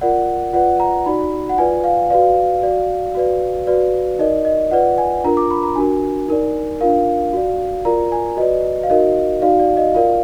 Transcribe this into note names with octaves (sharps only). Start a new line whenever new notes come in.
F4 A#4 D5 F#5
F4 B4 D5 F#5
A#5
D#4 F#4 D5 B5
F#5
F4 B4 D5 G#5
F5
F#4 B4 D5 F5
F#4 D5
F#4 B4 D5
F#4 B4 D5
D#4 A#4 D5 D#5
D#5
F4 B4 D5 F#5
G#5
D4 F4 A#4 A#5
D6
B5
A#5
D4 F#4 A#4 G#5
D#4 A#4 D5
D4 F4 A#4 F5
F#4 D5
F4 A#4 D5 A#5
G#5
F#4 B4 D5 D#5
F5
D#4 F#4 A#4 D#5
D#4 F#4 D5 F5
D5
D#5
F4 A#4 D5 F5